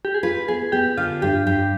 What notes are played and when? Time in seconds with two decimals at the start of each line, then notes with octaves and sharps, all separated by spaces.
0.05 G4
0.14 G#4
0.23 F4 B4
0.48 B3 G#4
0.72 B3 G4
0.97 D3 F4
1.22 G2 G4
1.47 G2 G4